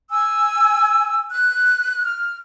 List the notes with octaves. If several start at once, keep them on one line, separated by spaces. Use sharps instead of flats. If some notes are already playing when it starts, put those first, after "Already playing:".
G#5 E6
F#6
F6